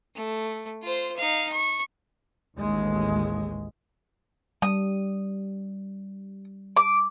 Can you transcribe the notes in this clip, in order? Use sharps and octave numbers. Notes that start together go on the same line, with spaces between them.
A3
F4 C5
D#4 F5
C#6
A1 D#2 G#3
G3 D#6
D6